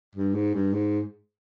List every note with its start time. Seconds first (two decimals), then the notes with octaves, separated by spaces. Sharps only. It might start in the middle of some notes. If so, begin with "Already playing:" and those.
0.15 G2
0.34 G#2
0.54 G2
0.74 G#2